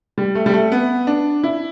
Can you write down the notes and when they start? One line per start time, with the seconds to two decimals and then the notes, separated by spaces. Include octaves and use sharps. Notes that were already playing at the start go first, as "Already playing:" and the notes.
0.18 G3
0.35 A3
0.46 G3
0.53 A3
0.72 B3
1.07 D4
1.43 E4